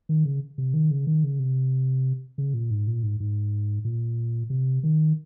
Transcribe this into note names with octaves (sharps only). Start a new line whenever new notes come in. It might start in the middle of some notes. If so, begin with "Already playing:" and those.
D#3
C#3
C3
D#3
C#3
D#3
C#3
C3
C#3
A#2
G#2
A#2
G#2
G#2
A#2
C3
D#3